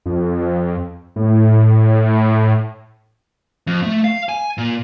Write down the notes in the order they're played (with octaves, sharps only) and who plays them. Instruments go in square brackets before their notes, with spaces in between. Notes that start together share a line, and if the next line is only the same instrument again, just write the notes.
[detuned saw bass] F2
A2
[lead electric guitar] F2
A3
F5
G#5
A#2